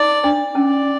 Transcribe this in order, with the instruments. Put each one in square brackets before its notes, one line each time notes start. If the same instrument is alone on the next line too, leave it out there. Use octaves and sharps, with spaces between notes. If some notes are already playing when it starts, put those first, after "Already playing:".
Already playing: [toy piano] D#4 [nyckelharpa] D5
[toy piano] D4
[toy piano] C#4 [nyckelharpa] D5